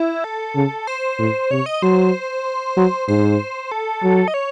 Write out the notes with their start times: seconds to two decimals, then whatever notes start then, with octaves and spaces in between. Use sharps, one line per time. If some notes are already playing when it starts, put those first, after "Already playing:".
Already playing: E4
0.24 A4
0.56 C#3
0.87 C5
1.19 A2
1.51 C3 C#5
1.66 D#5
1.82 F#3 C5
2.77 F#3
3.08 G#2 C5
3.72 A4
4.03 F#3
4.28 D#5
4.34 C#5